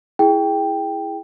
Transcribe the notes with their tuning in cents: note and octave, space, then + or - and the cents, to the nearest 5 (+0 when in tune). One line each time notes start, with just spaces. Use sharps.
E4 +0 G#4 +0 G5 +5